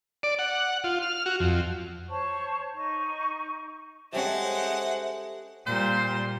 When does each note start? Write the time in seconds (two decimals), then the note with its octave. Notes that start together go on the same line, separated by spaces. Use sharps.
0.23 D5
0.39 F#5
0.84 F4
1.02 F6
1.26 F#4
1.40 F2
2.08 C5 C#5 A5 C#6
2.73 D#4 C#6
4.13 G#3 C#4 G4 A4 C5 E5 F#5
5.67 A#2 G3 C5